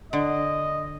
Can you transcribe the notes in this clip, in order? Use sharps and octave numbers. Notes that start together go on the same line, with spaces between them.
D3 D#5